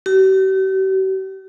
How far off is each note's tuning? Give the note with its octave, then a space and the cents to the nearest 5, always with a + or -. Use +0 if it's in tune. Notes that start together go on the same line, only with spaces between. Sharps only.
G4 -45